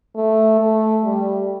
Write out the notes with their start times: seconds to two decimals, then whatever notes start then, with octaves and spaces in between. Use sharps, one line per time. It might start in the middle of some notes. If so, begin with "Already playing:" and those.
0.15 A3
0.60 A3
1.05 G3